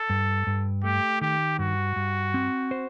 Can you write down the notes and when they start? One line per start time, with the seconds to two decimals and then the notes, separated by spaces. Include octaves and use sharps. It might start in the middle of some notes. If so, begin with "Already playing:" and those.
Already playing: A4
0.10 G2
0.47 G2
0.84 A3 G4
1.21 D#3 G4
1.59 G2 F#4
1.96 G2
2.34 C4
2.71 C5